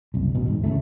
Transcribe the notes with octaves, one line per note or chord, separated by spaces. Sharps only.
F#1 C2
A1 B2
E1 G#2
D2 C#3 E3 A3